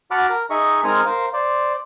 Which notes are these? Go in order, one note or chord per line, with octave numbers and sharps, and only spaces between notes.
F#4 F#5 A5 B5 D6 F6
A#4
D#4 G#4 D#5 E5 C#6
G#3 C4 D#4 A#4 G#5 F6
A#4 C5 F5
C5 D5